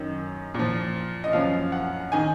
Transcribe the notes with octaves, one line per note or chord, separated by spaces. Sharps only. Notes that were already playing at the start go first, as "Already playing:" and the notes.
Already playing: F#2 D#3
A#2 F3
D#5
F#2 F3 F5
F#5
D#3 G#5